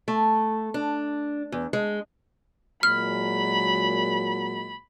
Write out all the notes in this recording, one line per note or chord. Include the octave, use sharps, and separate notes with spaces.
A3
D4
E2
G#3
A#2 F#3 G#3 B5 F6